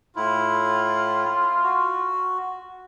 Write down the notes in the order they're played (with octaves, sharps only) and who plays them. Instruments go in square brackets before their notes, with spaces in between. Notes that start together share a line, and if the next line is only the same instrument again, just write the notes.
[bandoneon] A2 E4 [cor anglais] F4
[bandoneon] F#4